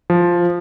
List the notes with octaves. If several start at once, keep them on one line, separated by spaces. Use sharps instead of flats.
F3